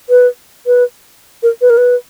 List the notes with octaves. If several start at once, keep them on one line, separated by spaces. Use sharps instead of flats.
B4
B4
A#4
B4
A#4
B4